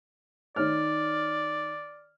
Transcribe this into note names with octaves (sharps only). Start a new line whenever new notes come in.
D#3 C#5 D5 F6